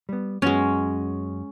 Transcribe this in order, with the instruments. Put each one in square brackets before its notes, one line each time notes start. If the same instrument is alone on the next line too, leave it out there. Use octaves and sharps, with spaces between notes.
[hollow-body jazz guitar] G3 B3
[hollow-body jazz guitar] F#2 B3 F#4 [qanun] G#3 C#4